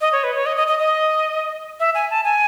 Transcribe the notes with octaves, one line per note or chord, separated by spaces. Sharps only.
D#5
C#5
B4
C#5
D#5
D#5
D#5
D#5
E5
G#5
A5
G#5